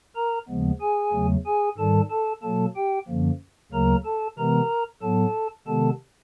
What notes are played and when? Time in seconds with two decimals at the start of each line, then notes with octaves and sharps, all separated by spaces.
0.15 A#4 A#5
0.48 D#2 C#3 F3 G#3 B3
0.81 G#4 G#5
1.13 E2 C#3 F#3 A3
1.46 G#4 G#5
1.78 G#2 D#3 G3 A4 A5
2.10 A4 A5
2.42 B2 F#3 A#3 A4 A5
2.76 G4 G5
3.08 F#2 D3 F3 A#3
3.72 D2 C#3 F#3 A#3 A#4 A#5
4.05 A4 A5
4.37 C3 E3 G#3 B3 A#4 A#5
5.02 A2 F#3 B3 A4 A5
5.67 C3 D#3 G#3 B3 A4 A5